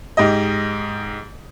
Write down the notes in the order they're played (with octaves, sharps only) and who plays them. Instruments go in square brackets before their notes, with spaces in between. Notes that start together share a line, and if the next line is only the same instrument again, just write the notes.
[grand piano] G#2 G4 D#5